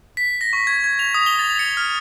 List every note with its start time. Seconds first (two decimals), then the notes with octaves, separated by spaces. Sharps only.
0.17 B6
0.41 A#6
0.53 C#6
0.67 G#6
0.84 G#6
0.99 F7
1.14 D#6
1.26 G7
1.39 A6
1.59 C#7
1.77 F6